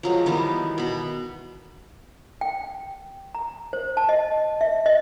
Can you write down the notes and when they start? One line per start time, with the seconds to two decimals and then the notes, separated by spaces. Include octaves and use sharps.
0.03 F3 F#3 G#3
0.26 D#3 E3 G3 B3
0.78 B2 B5
2.41 G5
3.35 A#5
3.73 C5
3.97 A5
4.09 D#5
4.61 E5
4.86 D#5